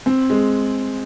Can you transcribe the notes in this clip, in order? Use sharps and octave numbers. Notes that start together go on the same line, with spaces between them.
C4
G#3